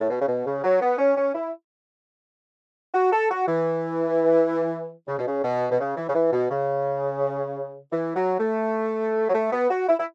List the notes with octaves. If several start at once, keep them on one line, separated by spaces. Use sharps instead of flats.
A2
B2
C#3
B2
C#3
F#3
B3
C#4
C#4
E4
F#4
A4
F#4
E3
C#3
B2
C#3
B2
B2
C#3
E3
C#3
E3
B2
C#3
E3
F#3
A3
F#3
A3
B3
F#4
E4
E4